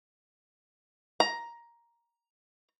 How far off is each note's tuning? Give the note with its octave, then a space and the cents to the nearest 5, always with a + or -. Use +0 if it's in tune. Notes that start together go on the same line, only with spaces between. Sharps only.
A#5 +10